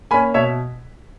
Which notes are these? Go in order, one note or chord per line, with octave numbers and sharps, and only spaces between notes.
A#3 C#4 G#5 B5
B2 C#5 E5